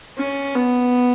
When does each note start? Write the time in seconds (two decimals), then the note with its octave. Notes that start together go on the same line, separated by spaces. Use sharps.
0.18 C#4
0.55 B3